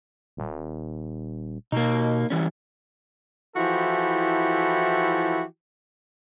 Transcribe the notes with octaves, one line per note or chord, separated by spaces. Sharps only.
D#1
B2 A#3 D#4
E3 G3 C#4
E3 F3 E4 F#4 G4 A4